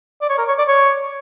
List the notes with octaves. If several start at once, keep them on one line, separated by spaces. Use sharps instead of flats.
D5
C#5
A#4
C#5
D5
C#5